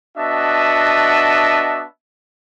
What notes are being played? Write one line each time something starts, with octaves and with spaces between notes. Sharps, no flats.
B3 D4 F#4 D#5 E5 A5